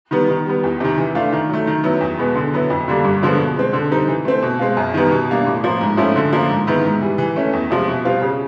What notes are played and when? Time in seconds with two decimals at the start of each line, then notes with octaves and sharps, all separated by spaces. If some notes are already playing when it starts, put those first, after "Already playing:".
0.11 D#3 G3 B3
0.29 D#3
0.46 G3 B3
0.63 E2
0.80 C3 D#3
0.98 E3
1.15 A3 D4 F4
1.32 D#3
1.49 F#3 A3
1.67 D#3
1.83 F#3 B3 E4
2.01 E2
2.19 B2 G#3 B3
2.36 D3
2.53 F#3 B3 E4
2.70 F2
2.88 D3 G3 A#3 D4
3.04 G2
3.22 D3 F3 G#3 B3
3.39 B2
3.56 G#3 C4
3.73 D3
3.91 G3 C4 D#4
4.08 E3
4.25 A3 C4
4.42 B2
4.59 G#3 C4 F4
4.77 F#2
4.94 D#3 G3 B3
5.11 B2
5.30 G3 A#3 D4
5.46 A2
5.64 F3 A#3
5.81 G#2
5.97 F3 A3 C#4 E4
6.16 D3
6.33 F3 A#3
6.50 G#2
6.67 D#3 G#3 B3 E4
6.85 G#2
7.01 E3 G3
7.18 E3
7.36 A3 C#4
7.53 E2
7.71 C3 F3 G#3
7.88 B2
8.05 G3 C4 F4
8.22 C#3